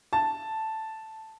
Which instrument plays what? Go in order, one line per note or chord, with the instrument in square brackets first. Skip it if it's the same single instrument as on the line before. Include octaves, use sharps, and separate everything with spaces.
[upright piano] A5